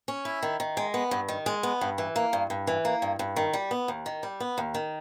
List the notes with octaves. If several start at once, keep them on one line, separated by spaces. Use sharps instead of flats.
C#4
E4
D#3
D#3
G#3
B3
G2
D#3
G#3
B3
G2
E3
A#3
G2
G2
E3
A#3
G2
G2
D#3
G3
B3
D#2
D#3
G3
B3
D#2
D#3